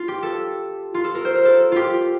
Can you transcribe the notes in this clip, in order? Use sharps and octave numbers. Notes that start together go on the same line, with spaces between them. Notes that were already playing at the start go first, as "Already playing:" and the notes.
Already playing: F4
G4
A4
F4
A4
A#4
C5
A#4
A4
F4 G4